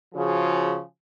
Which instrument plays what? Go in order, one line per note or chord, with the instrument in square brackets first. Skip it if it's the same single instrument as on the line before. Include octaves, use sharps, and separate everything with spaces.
[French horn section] C#3 F3 F#4 G#4